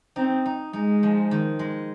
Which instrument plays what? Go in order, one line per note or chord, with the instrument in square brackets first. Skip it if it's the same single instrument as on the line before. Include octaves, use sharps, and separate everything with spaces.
[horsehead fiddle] C4 [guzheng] D#4
[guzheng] D#4
[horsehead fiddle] G#3 [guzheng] D#4
[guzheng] F3
D#3
G#3